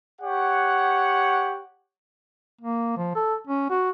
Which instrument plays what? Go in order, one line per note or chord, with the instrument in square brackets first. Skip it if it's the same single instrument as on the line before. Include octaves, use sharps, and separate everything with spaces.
[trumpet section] G4 C#5 F#5
[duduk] A#3
F3
A4
C#4
F#4